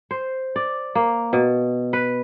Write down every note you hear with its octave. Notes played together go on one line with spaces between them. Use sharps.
C5
D5
A#3
B2
B4